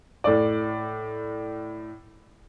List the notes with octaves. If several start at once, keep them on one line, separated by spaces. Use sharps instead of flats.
A2 D5